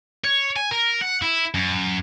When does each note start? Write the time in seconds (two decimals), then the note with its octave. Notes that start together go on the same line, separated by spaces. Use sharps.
0.24 C#5
0.56 G#5
0.71 A#4
1.01 F#5
1.22 E4
1.54 F#2